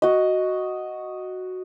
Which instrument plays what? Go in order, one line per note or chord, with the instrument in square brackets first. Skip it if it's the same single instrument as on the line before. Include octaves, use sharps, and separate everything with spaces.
[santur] F#4 D#5